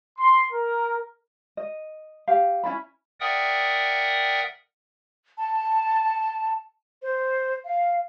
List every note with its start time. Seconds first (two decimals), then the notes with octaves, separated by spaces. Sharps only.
0.18 C6
0.52 A#4
1.57 D#5
2.28 G4 F5
2.64 C#4 E4 D5 B5
3.20 A#4 D5 E5 F#5 G5 D#6
5.38 A5
7.02 C5
7.65 F5